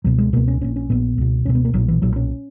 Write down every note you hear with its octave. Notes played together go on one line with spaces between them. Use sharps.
C#2 B2 F#3
G#3
C#2 B2 A#3
C#4
A#1 A#2 C#4
C#4
A#1 A#2 B3
C#2 B2
C#2 B2 C#4
B3
A#3
B1 A#2 F#3
E3
B1 A#2 F#3
C#4